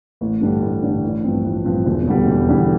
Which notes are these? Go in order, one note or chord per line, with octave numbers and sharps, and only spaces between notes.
A1
G2 D3 G3 D4
A1
G2 D3 G3 D4
A1
G2 F3 C4
A1
G2 F3 C4
E1
E2 D3 G3
E1
E2 D3 G3